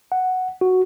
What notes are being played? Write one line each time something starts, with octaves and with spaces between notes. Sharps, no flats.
F#5
F#4